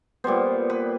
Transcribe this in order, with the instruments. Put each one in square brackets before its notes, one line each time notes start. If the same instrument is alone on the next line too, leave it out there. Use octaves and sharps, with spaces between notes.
[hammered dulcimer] A#2 G3 B3 C5
B4